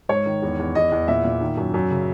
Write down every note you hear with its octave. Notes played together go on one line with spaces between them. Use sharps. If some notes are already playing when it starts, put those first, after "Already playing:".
G#2 C#5
D#3
E2
E2
E2 D#5
E2
A#2 E5
A#2
D#3
F#2
F#2
C#3